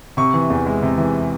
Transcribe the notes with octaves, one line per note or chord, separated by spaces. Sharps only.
C3 C#6
E3
E2
G#3
C3
E3